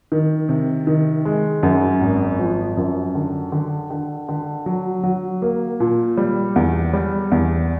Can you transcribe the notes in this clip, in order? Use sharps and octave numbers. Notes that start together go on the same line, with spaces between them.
D#3
C3
D#3
G#3
F#2
G#1
F3
F#2
D3
D3
D3
D3
F#3
F#3
A#3
A#2
G3
E2
G3
E2